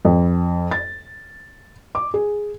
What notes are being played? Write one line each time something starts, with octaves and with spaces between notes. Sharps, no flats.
F2
A6
D6
G#4